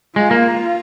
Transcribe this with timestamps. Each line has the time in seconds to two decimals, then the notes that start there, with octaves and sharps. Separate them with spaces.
0.16 G#3 F4
0.31 A#3